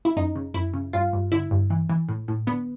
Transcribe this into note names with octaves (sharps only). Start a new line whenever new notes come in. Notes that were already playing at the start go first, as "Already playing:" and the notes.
E4
F#2 D#4
C#3
F#2 E4
C#3
G2 F4
G2
D3 E4
G2
E3
E3
A2
A2
D3 B3